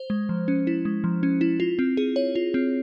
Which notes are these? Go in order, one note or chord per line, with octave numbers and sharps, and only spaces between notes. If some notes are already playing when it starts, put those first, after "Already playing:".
Already playing: C5
G#3
F3
C#4
E4
G#3
F3
C#4
E4
F4
C4
G#4
C#5
F4
C4